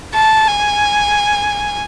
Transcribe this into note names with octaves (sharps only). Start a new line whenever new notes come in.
A5
G#5